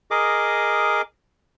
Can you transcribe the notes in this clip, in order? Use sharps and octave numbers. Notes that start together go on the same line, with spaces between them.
G#4 A#4 D#5 D6